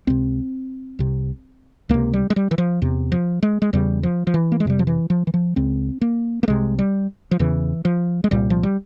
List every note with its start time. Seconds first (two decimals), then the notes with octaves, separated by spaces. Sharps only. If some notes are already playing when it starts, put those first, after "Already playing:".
0.07 C#2 C3 C4
0.99 C2 C3
1.89 C#2 C3 A#3
2.13 G3
2.30 G#3
2.36 G3
2.51 E3
2.58 F3
2.82 E2 C3
3.12 F3
3.43 G#3
3.62 G#3
3.73 E2 C#3 G3
4.03 F3
4.27 F3
4.34 E3
4.52 A#3
4.60 G#3
4.65 F2 C3 G3
4.79 F3
4.87 E3
5.10 F3
5.27 E3
5.34 F3
5.56 C#2 C#3 C4
6.01 A#3
6.43 A#3
6.48 C2 C3 G#3
6.79 G3
7.31 F3
7.39 E2 C#3 E3
7.85 F3
8.24 G#3
8.31 C2 A#2 G3
8.50 F3
8.63 G3